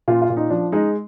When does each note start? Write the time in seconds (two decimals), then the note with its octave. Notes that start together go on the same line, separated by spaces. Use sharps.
0.08 A#2 F4
0.22 F4
0.30 A#2
0.37 D#4
0.50 F3 D4
0.72 G#3 D#4